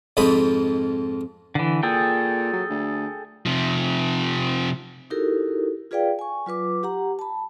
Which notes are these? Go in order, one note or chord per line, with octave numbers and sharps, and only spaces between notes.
F2 G#2 F3 D#5 B5 D#6
D3 E3
A#2 G#4 A4 G5
F#3
D2
C3 F3
D#4 E4 F#4 G4 A4 A#4
F4 G#4 B4 D5 F5 G5
G#5 C#6
F#3 F4 B4 D6
G4 F#5 A#5
A5 B5